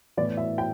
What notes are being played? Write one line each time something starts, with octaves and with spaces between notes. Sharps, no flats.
A2 E3 B3 D5
E5
G5